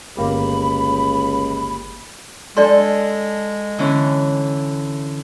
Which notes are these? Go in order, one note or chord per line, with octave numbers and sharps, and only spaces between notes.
G1 C#2 A#3 G4 B5
G#3 D4 A4 D5 C6
D3 E3 C#4